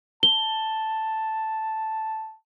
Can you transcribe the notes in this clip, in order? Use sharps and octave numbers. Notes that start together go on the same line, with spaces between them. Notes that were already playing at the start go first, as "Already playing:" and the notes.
A5 G7